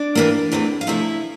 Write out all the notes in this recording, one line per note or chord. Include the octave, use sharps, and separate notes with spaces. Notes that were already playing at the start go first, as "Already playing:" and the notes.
Already playing: D4 D5
A2 E3 A#3
E2 E3 A3 C4
F5
C3 F3 A3 E4 E5